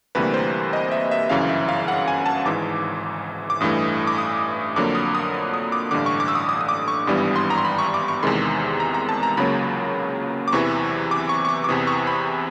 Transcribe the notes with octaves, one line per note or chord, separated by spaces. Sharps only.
D2 C3 E3 G3 A#3 B4
C5
D#5
E5
E5
G1 F#2 C#3 E3 F5
F5
E5
F5
F#5
G#5
A5
G#1 G#2 E3 D6
D6
A1 G2 E3 A3 D#6
D6
D#6
F2 D3 F#3 A#3 D6
D#6
D#6
D#6
D#6
D6
A1 G2 D3 D6
C#6
D6
E6
D#6
D#6
D#6
D6
C#6
G#1 G2 E3 G3 B3 D#6
C6
A#5
C6
B5
C#6
D6
C#6
E2 C3 D#3 G#3 C6
A#5
A#5
A5
A#5
C#2 C#3 F#3 A#3 B5
D6
E2 C3 E3 C#6
D6
C#6
C#6
D6
D6
E2 C3 E3 D#6
C#6
B5